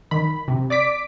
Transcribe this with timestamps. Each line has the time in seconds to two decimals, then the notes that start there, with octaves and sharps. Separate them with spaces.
0.11 D#3 B5
0.48 C3
0.70 D5 D6 B6 D7